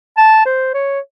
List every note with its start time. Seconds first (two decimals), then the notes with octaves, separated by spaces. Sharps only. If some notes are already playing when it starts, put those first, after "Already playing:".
0.18 A5
0.46 C5
0.74 C#5